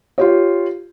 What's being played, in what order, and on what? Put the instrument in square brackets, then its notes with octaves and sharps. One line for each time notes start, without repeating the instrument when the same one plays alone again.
[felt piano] F4 G4 C#5